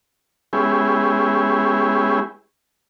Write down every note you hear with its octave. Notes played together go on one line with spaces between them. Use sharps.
G#3 B3 C#4 E4 G4 G#4